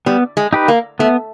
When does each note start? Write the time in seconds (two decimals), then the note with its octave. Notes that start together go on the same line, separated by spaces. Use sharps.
0.06 G3 B3
0.37 G#3
0.53 D#4 G4 B4
0.68 A#3
0.99 A3 B3